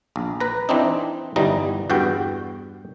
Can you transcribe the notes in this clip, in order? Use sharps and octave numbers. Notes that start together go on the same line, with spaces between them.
A#1
B4 A#5
E3 C4 D4 D#4
G1 E3 G3 D#4 D#5
E2 G2 F#4 G5